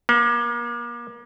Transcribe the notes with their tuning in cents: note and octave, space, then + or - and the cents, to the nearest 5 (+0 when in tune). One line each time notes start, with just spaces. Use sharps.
A#3 +35